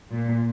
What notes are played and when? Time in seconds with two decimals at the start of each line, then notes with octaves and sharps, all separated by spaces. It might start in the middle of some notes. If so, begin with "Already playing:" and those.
0.12 A#2